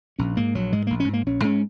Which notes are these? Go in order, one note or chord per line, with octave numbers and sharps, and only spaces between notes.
A#1 C#4
G#2 A#3
A#1 F#3
G#2 G#3
A#1 A#3
C#4
G#2
A#3
A#1 C#4
G#2 C#4